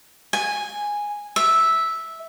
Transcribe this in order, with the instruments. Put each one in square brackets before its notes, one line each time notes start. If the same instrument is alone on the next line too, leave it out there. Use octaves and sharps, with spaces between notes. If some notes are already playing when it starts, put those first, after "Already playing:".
[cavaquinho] G#5
E5